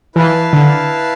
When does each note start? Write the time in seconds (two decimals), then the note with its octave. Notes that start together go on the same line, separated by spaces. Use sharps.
0.16 E3 E4 B4 F5 A5
0.53 D3